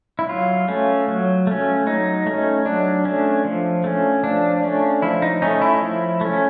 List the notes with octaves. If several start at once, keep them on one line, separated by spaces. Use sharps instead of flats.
E4
F#3 F4
A3 C#4
F#3
A3 C#4
F#3 D#4
A3 C#4
F#3 D4
A3 C#4
F3
A3 C#4
F3 D4
A3 C#4
F3 E4
D#4
A3 C#4 D#4
E4
F3
A3 C#4